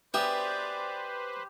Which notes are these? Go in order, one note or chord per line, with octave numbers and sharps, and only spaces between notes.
B3 G4 G#4 B4 C5 D5 E5